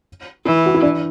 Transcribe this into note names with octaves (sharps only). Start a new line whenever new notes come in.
E3 E4
F#4
E4
D4